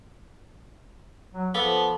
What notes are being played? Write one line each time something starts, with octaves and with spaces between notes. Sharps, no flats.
F#3
F3 B3 A4 F5 D6